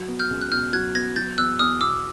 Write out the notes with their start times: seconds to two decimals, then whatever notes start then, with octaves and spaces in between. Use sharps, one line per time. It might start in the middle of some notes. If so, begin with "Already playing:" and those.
Already playing: F#3
0.08 B3
0.19 F6 G6
0.31 C#2
0.41 F#6
0.52 B2 F6 G6
0.73 F#3 F#6 G#6
0.95 B3 G#6 A#6
1.16 F#3 G6 A6
1.38 E2 E6 F#6
1.59 E2 D#6 F6
1.81 B2 D6 E6